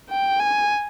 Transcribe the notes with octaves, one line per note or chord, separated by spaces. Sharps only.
G5
G#5